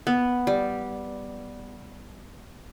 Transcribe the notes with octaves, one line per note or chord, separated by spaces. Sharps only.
B3
G3